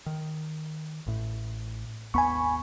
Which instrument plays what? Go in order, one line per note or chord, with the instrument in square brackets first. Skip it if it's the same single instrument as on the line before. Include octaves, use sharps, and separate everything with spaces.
[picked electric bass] D#3
A1 A2
[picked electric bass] G#1 D#2 B3 [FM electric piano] G#5 B5 C#6